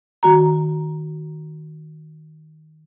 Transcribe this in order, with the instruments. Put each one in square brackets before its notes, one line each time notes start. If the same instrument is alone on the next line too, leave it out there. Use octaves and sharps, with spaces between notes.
[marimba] D#3 F#4 A#5